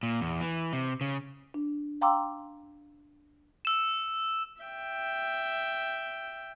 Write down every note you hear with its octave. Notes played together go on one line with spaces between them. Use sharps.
A#2
E2
E3
C3
C#3
D4
F5 G5 A#5 C6 D6 E6
E6 E7
E5 G5